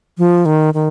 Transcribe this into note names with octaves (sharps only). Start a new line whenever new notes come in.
F3
D#3
D#3